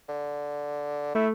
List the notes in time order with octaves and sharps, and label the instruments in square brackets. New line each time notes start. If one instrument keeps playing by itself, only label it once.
[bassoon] D3
[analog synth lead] A3 [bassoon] E4